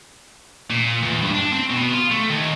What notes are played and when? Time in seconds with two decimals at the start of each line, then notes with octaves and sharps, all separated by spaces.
0.70 A#2
1.03 E2
1.22 G2
1.35 D4
1.53 C4
1.70 B2
1.93 F4
2.10 A3
2.29 D#2